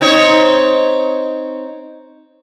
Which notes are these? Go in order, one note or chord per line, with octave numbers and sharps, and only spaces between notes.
C4 D#4 C#5